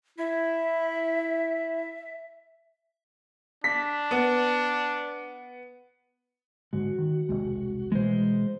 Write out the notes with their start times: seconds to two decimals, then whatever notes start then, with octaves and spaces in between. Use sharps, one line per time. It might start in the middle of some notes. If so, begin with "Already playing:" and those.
0.18 E4 E5
3.64 D4 B6
4.11 B3
6.73 G#2 D3 G#3 F#4
6.98 D#3
7.29 E1 C2 G#3
7.92 B2 E3 G#3 C5